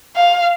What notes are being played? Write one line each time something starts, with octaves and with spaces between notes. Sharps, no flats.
F5